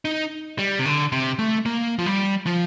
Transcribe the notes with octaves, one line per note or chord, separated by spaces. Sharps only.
D#4
G3
C3
D3
C3
A3
A#3
F3
G3
F3